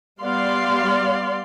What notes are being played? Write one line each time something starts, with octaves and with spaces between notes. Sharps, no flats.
G3 B3 D5 F5 C6